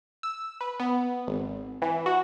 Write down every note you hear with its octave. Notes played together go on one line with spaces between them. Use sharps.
E6
B4
B3
G#1
E3
F#4